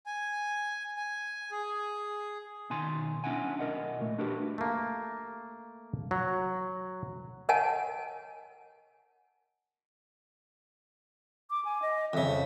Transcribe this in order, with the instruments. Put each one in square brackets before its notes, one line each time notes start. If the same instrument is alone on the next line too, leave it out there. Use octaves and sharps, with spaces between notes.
[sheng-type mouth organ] G#5
G#5
G#4
[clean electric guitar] B2 D#3 G#5 C6
C#4 D4 E4 F#5 G#5
B1 A#4 D#5 F#5
A#2 A3
D4 F#4 G4 A#4 B4
[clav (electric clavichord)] A3 A#3
F#3
[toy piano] A#4 C#5 D#5 F#5 G#5 A5
[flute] D6
G#5
D#5
[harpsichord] F2 C#3 [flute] E5